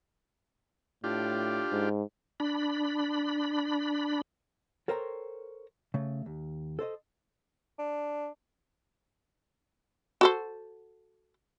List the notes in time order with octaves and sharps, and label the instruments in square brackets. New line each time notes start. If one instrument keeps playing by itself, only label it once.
[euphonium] A2 [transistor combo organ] D4 F4 G4
[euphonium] G#2
[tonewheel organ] D4 B5
[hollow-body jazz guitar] A4 A#4 C5 C#5 G5 A#5
C#3 A3
D#2
A4 C5 D5 D#5
[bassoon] D4
[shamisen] F#4 A4 C5